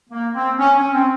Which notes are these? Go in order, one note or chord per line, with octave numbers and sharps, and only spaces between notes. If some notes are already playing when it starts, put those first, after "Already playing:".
A#3
C4
C#4
C#4
C4